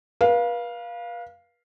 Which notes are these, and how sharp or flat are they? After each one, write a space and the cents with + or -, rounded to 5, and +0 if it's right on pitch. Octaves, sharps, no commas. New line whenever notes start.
B4 -40 F5 +0